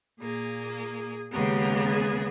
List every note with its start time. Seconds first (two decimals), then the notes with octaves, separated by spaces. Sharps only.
0.19 A#2 A#3 G#4
1.32 D#2 C#3 G#3 B3 G4 A#4
1.88 G#4